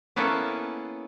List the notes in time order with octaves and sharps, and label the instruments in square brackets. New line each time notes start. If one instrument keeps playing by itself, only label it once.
[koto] A#3 B3 C#4 E4 A4